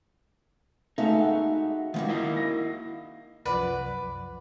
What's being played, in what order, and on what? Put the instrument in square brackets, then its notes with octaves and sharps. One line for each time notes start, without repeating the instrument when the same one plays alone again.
[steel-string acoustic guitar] G#3 E5 F5 [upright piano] A3 [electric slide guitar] D#4 F#4
[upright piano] F#5
[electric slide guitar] D#3 F3 G#3 [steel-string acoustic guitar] A#3 D#4 F#4
[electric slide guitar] E4 D#5 F5
[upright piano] A#6
[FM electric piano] C2 F#2 F3 [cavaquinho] B4 D5 F#5